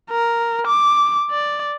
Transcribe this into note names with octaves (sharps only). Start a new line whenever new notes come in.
A#4
D6
D5